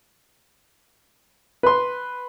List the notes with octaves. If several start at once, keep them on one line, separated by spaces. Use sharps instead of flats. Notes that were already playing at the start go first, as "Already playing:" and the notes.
B4 C6